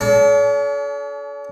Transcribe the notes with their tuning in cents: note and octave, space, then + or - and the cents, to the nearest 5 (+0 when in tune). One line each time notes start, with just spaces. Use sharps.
C#4 +45 A4 -35